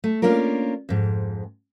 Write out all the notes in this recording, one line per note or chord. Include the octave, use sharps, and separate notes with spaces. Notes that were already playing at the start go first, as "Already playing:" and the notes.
A3
A#3 C#4 D4 F4 A#4
F2 G#2